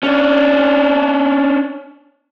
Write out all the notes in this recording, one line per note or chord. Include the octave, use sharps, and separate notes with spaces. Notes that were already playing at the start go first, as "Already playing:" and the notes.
C#4 D4